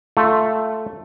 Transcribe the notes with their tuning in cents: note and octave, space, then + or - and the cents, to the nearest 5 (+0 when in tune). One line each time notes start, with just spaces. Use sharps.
A3 +0 F4 +0